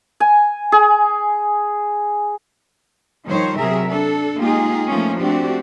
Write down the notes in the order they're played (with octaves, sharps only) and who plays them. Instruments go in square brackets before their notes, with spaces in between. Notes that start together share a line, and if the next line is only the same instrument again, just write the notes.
[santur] G#5
G#4
[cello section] D#3 F3 G3 C5 C#5
C3 F#3 G#4 A#4 E5
D4 A4
G#3 A#3 D#4 F4 G4 G#4
F3 A3 A#3 C#4
A3 C4 D4 F#4 G4